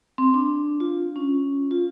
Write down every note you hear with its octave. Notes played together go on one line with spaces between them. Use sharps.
C4
D4
F4
C#4
F4